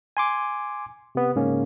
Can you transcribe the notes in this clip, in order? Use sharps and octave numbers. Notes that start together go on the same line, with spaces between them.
G#5 C6 D6
C3 B3
G#2 C#3 A#3 C#4